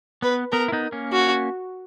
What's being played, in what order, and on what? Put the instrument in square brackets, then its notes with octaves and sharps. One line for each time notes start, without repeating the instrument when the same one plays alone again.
[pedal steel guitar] B3 [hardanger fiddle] B4
[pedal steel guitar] B3 [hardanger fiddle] A#4
[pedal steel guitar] E4
B3 D#4
A#3 C#4
[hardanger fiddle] F#4